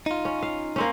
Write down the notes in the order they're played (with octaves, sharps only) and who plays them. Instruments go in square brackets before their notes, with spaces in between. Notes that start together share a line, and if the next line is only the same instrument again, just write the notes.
[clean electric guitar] D#4 F4
[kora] C#4
F5
A#3 C4 C#4